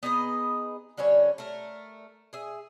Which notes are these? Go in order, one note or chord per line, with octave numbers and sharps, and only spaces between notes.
B3 D#4 G#4 D#5
D3 G3 C#4 C#5
A3 A#4
G#4 E5